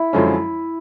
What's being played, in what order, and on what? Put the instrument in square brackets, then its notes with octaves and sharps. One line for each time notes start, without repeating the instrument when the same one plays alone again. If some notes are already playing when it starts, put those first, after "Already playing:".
Already playing: [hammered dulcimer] E4
[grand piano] F#2 D3 F3 G#3 C#4